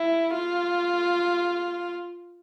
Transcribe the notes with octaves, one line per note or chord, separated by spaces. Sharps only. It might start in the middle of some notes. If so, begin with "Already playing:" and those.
Already playing: E4
F4